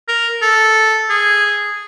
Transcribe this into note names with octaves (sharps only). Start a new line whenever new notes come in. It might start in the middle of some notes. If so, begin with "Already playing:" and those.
A#4
A4
G#4